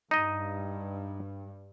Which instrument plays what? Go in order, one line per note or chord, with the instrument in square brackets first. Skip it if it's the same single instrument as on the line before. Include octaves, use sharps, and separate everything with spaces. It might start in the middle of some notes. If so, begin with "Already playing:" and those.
[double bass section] G2 [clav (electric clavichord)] D#4 D#5